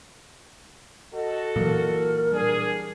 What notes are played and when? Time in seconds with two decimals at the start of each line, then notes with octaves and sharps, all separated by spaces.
1.14 F#4 A4 D#5
1.56 A#2 E3 F#3 A#4
2.32 G3 D4 G#4